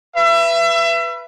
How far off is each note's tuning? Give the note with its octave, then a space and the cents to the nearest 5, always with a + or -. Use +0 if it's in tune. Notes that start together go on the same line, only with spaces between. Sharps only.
B4 +0 E5 +30